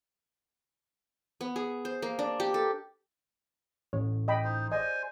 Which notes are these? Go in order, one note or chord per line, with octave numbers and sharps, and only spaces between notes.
B3
G#4
C5
A#3
D4
G4
A4
A1 C#5
D#5 G5 B5
D#4 C5
C5 D5 D#5 G#5